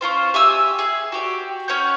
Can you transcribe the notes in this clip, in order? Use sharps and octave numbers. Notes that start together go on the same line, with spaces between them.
C#4 E4 F4 C5
G4 E5 G#5 E6
G#4
F#4 G4 D5
C#4 C#5 F#5 G6